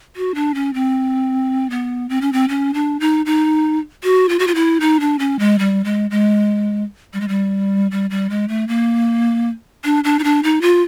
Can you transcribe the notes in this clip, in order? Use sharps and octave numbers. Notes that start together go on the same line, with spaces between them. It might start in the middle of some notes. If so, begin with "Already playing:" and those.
F#4
D4
C#4
C4
B3
C4
C#4
C4
C#4
D4
D#4
D#4
F#4
F4
F#4
F4
E4
D#4
D4
C#4
G#3
G3
G#3
G#3
G3
G#3
G3
G3
G3
G#3
A3
A#3
D4
D4
D#4
D4
D#4
F4